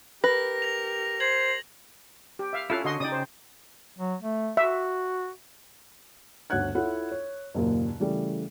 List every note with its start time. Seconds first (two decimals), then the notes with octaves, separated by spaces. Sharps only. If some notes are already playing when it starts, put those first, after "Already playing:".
0.24 G4 A#4 B4 A#6
0.62 A#6 F7
1.20 C5 G#6 F#7
2.39 G4
2.53 E5 F5
2.70 C#4 E4 F4 A4 F5 F#6
2.84 D3 F#4 D#5 C6
3.00 C#3 D#4 D5 G5 D#6
3.12 C5
3.99 F#3
4.22 A3
4.57 F#4 E5
6.50 G1 D2 C#5 F#5 F#6 G#6
6.75 E4 F4 A4 C#5 F#5
7.12 C#5
7.54 F#1 D#2 A#2
8.00 C#3 E3 G3 A3